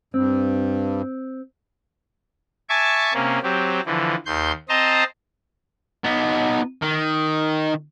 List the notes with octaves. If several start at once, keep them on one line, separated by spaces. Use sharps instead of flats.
G2 C4
E5 G#5 A5 C#6 D6
C3 A#3 C#4
F#3 C4 G4
D3 E3 F3
D#2 C6 G6
C4 C5 D#5 A5 A#5 C6
B3 D#4
D#3